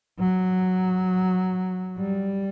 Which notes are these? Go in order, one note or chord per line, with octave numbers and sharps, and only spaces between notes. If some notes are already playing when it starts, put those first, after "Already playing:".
F#3
G3